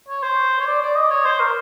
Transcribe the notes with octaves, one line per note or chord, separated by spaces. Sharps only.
C#5
C5
C#5
D5
D5
D#5
C#5
C5
A#4